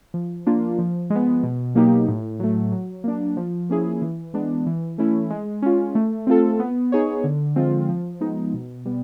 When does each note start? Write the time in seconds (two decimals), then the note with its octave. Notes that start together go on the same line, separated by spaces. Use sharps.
0.14 F3
0.46 A#3 D4 F4
0.78 F3
1.10 G#3
1.15 B3
1.43 B2
1.75 F#3 A#3 D#4 G4
2.08 A2
2.40 F#3 A3
2.72 F#3
3.04 A#3 D4
3.37 F3
3.70 A#3 C#4 E4 G#4
4.02 E3
4.34 G#3 B3 D4
4.66 E3
4.98 A3 C#4 E4
5.30 G#3
5.62 C#4 F4
5.95 A3
6.27 C4 F4 A4
6.59 B3
6.92 D#4 G#4 C#5
7.24 D3
7.56 F3 G#3 C4 F4
7.89 F3
8.21 G#3 B3 D#4
8.54 B2
8.86 G3 B3